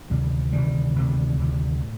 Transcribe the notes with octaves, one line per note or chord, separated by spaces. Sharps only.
D2 C3 D#3 G3
D2 C3 D#3 G3
D2 C3 D#3 G3
D2 C3 D#3 G3
A2